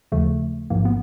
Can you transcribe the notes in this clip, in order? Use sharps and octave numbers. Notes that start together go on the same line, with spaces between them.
D#2 C#3 F3 A3
A1 G#2 F3 A#3
B3